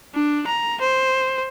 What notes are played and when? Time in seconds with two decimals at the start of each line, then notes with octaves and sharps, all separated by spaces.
0.15 D4
0.47 A#5
0.81 C5